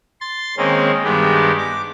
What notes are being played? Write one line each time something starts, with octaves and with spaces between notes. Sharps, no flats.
C6 A6
D#3 G#3 A#3 C4 C#4
G2 D#3 G#3 B3 D4 G4
D6